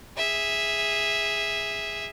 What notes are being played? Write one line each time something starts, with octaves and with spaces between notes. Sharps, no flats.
G#4 E5